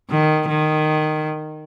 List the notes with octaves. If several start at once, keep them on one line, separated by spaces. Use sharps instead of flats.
D#3
D#3